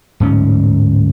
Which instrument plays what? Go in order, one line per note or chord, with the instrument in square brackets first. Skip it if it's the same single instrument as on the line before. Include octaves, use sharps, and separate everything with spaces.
[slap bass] D1 G#2 C#4